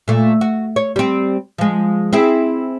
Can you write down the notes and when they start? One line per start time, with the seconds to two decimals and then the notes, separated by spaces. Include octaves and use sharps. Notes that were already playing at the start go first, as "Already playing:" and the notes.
0.08 A#2 A3
0.41 F#4
0.76 C#5
0.96 G3 C4
1.58 F3 G#3
2.13 C4 E4 G#4